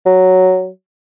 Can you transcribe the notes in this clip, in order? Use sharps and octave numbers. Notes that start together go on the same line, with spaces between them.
F#3